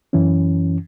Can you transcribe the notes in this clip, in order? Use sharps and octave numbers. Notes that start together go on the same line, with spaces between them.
F#2 E3 C#4